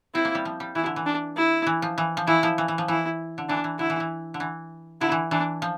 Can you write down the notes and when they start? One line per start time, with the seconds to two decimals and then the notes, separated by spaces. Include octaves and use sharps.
0.15 C4 E4
0.25 A#3
0.35 G3
0.45 F3
0.60 G3
0.75 E3 E4
0.86 D3
0.96 E3
1.06 D4
1.37 E4
1.67 E3
1.82 F3
1.98 E3
2.17 F3
2.27 E3 E4
2.43 F3
2.58 E3
2.68 E3
2.78 F3
2.88 E3 E4
3.38 D3
3.49 E3 D4
3.64 E3
3.79 D3 E4
3.90 E3
4.00 E3
4.34 D3
4.40 E3
5.01 D3 E4
5.12 E3
5.31 E3 D4
5.62 F3